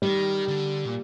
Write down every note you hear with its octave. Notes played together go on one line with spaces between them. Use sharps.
D#3 G3
D3
A#2